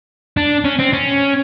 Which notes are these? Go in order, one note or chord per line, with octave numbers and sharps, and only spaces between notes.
D4
C#4
C4
C#4